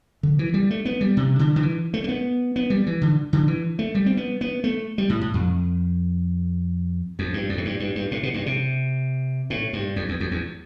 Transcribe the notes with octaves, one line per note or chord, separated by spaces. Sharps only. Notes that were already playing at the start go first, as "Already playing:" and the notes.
D3
E3
G3
A3
B3
G3
C3
D3
D3
E3
A3
A3
B3
B3
G3
E3
D3
D3
E3
A3
G3
C4
B3
B3
A3
G3
A2
A2
F2
F2
G2
F2
A2
G2
G2
G2
A2
B2
G2
C3
A2
G2
F2
E2
F2
E2